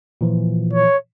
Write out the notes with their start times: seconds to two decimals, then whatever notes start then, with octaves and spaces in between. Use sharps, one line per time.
0.21 A#2 E3 F3
0.73 C#5